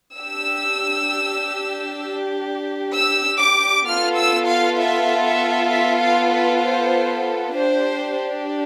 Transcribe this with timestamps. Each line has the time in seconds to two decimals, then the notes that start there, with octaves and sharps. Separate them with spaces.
0.17 D4 G4 E6
2.93 E6
3.40 D6
3.86 B3 F4 A4 F6
4.16 E6
4.47 F5
4.78 E5
5.24 E5
5.70 E5
6.01 F5
6.31 B4
6.62 C5
7.54 D4 G4 C5